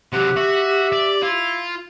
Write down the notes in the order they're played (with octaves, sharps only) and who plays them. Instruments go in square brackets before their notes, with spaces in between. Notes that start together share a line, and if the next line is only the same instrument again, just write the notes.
[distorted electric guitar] C3 F#3 [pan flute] G4 [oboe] F#5
[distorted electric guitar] F#4 [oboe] E5
[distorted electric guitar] D5
[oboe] E4 [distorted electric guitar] F4